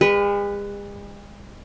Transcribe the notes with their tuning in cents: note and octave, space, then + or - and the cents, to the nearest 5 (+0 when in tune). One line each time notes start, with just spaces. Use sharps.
G#3 -45 B4 +0